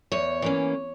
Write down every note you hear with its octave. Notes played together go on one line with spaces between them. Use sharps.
E2 C#5
E3 A#3 C#4